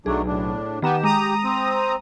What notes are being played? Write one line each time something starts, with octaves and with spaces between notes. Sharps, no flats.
B1 F#3 A3 D4 G#4
A2 D4
D#3 B3 G4 A#5 E7
G#3 A#5 D#6
C4